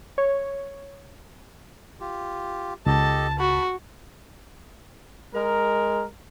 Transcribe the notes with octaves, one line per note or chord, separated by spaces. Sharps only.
C#5
F4 G4
C#2 G4 A4 D#5 A5
F#4 A5 B5
G#3 A#4